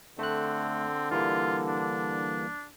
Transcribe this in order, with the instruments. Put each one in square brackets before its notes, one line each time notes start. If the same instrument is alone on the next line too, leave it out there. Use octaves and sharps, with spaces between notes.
[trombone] D3 [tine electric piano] A3 F#6 [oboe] C4
[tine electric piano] E3 G3 A#3 [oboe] F4
[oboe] D4